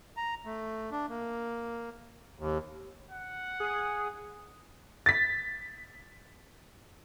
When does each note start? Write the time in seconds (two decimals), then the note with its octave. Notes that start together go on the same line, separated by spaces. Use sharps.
0.17 A#5
0.45 A3
0.92 D4
1.09 A#3
2.39 D#2
3.11 F#5
3.60 G#4
5.06 A6 B6